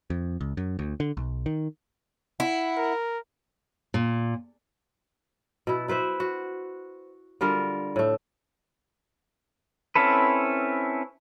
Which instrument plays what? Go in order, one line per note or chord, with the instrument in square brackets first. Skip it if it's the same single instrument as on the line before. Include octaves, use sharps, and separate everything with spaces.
[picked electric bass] F2
C#2
F#2
D2
D3
B1
D#3
[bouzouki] E4 [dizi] F#5
[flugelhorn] A#4
[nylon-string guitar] A#2
[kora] B2 E4
E4 B4 C5 E5
F#4
D3 G3 F4 A#4
A2 A3
[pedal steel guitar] C4 C#4 E4 A4 B4